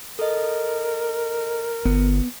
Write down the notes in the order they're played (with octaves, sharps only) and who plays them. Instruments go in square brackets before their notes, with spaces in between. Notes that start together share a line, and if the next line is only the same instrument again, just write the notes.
[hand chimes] A4 D#5 [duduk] A#4
[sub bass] G1 [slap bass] B3